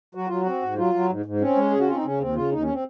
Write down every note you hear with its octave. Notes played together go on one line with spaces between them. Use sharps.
F#3 F#4
F#3 F4
F#4
C4
G#2
F#3 F4
F#3
G#2
G#2
C4 C#4
G#3
C#3 G#4
F#4
C4 F4
D#4
C#3 C#4
D#2 C4
C#3 F4
D#2 D#4
C#4
C4